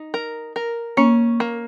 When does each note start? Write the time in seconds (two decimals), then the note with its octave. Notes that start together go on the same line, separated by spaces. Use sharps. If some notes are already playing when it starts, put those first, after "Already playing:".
Already playing: D#4
0.14 A#4
0.56 A#4
0.97 A#3 C#4
1.40 A#3